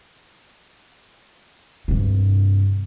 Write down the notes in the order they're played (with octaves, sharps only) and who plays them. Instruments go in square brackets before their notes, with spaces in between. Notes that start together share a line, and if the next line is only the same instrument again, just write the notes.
[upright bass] G2 C3